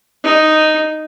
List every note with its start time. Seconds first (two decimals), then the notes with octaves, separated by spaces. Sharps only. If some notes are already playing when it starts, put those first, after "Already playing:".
0.24 D#4